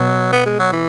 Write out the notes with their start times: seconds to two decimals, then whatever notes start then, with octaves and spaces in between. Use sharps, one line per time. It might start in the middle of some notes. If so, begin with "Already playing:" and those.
Already playing: B2 F#3
0.33 B3
0.46 G#3
0.59 F#3
0.72 E3